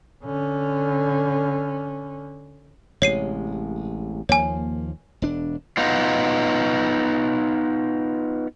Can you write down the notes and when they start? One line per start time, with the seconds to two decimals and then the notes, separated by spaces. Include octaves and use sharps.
0.24 D3 C#4
3.02 A1 C3 G#3 C#5 C7 D#7
4.29 D#2 F3 A#3 C#5 G#5
5.22 E1 D4
5.77 B3 D#4 F4